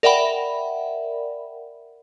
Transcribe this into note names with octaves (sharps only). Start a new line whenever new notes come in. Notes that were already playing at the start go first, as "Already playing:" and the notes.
A#4 D5 E5 F#5 G5 B5